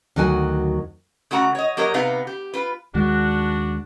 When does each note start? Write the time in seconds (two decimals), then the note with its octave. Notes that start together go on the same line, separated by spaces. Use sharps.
0.16 D2 D#3 F#3 F#4 G#5
1.31 C#3 A3 F#4 F#5 A#5
1.55 C#5 D#5
1.77 F#3 A#3 G4 A#4 C#5 D#5
1.94 C3 B3 D#4 F5
2.27 G4
2.54 F4 B4
2.94 D#2 D#3 G#3 D4 F#4